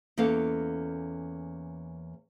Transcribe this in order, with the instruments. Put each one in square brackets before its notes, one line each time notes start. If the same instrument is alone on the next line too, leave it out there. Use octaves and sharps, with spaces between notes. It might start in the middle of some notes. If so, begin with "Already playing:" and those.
[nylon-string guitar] E2 A#3 C#4 A4 F5